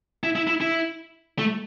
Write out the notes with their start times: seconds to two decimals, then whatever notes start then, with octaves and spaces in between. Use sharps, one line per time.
0.24 E4
0.36 E4
0.47 E4
0.61 E4
1.39 A3